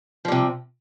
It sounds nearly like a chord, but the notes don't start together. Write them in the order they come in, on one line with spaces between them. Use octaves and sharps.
F3 G3 C3